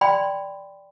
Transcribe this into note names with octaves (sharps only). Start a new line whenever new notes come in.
D5 G5 B5 C6